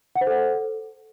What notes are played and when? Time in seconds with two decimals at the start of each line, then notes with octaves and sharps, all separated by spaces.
0.16 F#5
0.21 C5
0.27 A4